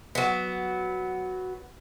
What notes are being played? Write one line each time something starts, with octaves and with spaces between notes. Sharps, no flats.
F#3 B3